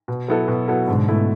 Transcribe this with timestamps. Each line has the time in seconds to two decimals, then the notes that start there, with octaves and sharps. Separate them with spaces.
0.08 B2
0.28 F#3 B3 E4 A4
0.48 B2
0.68 F#3 B3 E4 A4
0.88 G#2 B2 D3
1.08 A3 E4